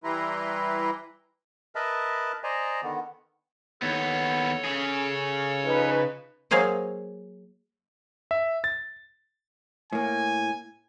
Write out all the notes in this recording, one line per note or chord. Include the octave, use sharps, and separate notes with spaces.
E3 G3 E4 B4 A#5 C6
A#4 B4 D#5 E5 A5 B5
C5 D5 D#5 G#5 A#5
D3 D#3 B3
D#2 B3 A4 C#5
C#3 G#4
F3 D#4 B4
F#3 A#3 G#4 C5 D#5
E5
A6
A2 A#3 G#5